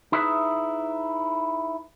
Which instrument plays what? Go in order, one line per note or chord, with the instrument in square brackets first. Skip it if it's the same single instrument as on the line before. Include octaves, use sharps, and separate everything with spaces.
[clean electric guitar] D#4 E4 G#4 B4 C#5 E5